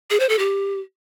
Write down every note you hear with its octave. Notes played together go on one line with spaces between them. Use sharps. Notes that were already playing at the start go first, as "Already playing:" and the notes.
G#4
C5
A4
G4